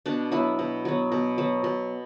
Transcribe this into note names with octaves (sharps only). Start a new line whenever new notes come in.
B2 D4
F#3 B3 E4
B2
F#3 B3
B2
F#3 B3
B2